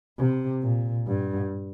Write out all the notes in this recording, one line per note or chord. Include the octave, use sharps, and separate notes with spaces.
C3
A#2
G2